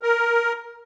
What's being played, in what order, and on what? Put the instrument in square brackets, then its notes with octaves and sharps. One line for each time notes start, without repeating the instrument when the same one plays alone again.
[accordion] A#4